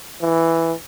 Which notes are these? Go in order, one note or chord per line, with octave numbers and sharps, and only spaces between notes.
E3